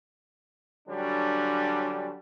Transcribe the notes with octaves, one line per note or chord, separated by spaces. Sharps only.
D3 F#3 G3 C#4 D4